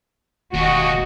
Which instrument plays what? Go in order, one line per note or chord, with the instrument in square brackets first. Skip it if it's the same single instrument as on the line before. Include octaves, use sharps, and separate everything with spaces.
[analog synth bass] E1 [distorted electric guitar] D#2 [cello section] F#4 D#5